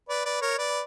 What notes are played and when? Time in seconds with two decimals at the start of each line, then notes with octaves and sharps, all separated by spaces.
0.09 B4 D5
0.25 B4 D5
0.42 A#4 C#5
0.58 B4 D5